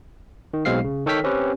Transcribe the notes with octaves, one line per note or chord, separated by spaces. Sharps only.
D#3
B1 B2 G#3 C4 F5 C7
C#3
D#3 A4 C#5 G5 F6 B6
C4 C#4 G4 B4